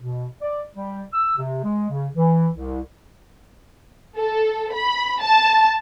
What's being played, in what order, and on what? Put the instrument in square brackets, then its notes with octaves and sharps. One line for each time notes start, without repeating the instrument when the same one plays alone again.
[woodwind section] B2
D5
G3
E6
C3
G#3
C#3
E3
C2
[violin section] A4
B5
A5